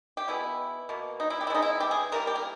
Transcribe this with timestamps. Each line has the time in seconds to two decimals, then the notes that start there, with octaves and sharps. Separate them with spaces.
0.17 G4
0.28 B2 G#3 B3 E4
0.89 B2 A#3
1.20 D#4
1.30 E4
1.41 G4
1.47 E4
1.50 C#3 G#3 B3 D#4
1.62 E4
1.80 G4
1.91 G#4
2.12 E3 G3 A#3 A#4
2.27 G4
2.35 A#4